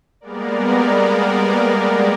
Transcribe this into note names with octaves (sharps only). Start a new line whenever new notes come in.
G3 G#3 A#3 B3 A#4 D5